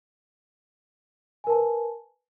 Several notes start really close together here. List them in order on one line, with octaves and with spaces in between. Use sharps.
G#5 A#4 A5 B4